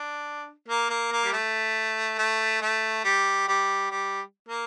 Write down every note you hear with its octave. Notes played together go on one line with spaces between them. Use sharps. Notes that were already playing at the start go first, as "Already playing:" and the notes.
Already playing: D4
A#3
A#3
A#3
G3
A3
A3
A3
G3
G3
G3
A#3